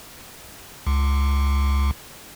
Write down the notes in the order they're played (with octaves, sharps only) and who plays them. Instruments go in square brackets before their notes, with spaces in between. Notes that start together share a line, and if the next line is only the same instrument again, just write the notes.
[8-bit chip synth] C#2